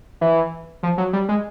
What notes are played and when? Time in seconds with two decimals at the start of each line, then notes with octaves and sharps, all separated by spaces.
0.21 E3
0.83 F3
0.98 F#3
1.13 G3
1.29 G#3